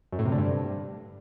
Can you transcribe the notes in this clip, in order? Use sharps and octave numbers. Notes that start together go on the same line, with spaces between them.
F#2
A2
C3
D3
G2